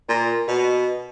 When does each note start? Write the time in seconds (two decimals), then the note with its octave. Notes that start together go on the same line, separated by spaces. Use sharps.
0.09 A#2
0.48 B2